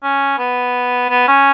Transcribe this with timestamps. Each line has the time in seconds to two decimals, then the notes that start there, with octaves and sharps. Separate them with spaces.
0.03 C#4
0.38 B3
1.10 B3
1.28 C#4